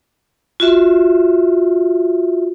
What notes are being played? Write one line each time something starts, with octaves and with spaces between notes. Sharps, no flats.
F4 F#4 E5